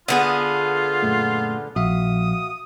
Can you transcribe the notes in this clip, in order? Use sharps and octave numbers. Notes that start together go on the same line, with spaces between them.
D3 B3 F4 G#4
F#2 A#2 A3
A#1 F#4 E5 F5 D#6